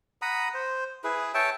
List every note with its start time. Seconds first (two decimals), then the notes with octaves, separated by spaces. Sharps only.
0.22 F#5 A#5 B5 D#6
0.54 C5
1.04 E4 G#4 B4
1.34 C#5 E5 G5 A5